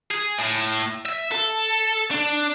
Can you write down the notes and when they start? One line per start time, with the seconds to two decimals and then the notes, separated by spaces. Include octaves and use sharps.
0.11 G#4
0.38 A2
1.05 E5
1.32 A4
2.11 D4